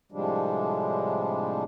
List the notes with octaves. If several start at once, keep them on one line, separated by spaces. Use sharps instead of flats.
A2 C3 F3 G3 G#3 D4